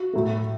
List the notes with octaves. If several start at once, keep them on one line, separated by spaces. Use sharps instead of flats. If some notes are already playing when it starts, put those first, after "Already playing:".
Already playing: F#4
A2 F#3 A3